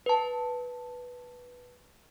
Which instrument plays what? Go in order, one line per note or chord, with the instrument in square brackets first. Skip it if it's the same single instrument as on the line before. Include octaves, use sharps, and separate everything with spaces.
[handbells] B4 A5